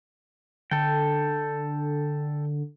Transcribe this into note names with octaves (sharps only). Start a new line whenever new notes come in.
D3 A4 G5